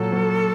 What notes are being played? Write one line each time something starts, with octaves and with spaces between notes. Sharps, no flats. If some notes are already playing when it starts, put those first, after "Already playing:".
Already playing: A#2 F#3 A4
F#3